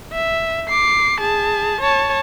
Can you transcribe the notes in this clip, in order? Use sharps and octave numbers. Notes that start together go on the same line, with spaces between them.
E5
D6 C7
G#4 A5
C#5 A5